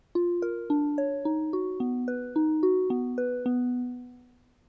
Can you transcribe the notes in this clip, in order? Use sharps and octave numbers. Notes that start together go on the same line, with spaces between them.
F4
A#4
D4
C#5
D#4
F#4
B3
B4
D#4
F#4
B3
B4
B3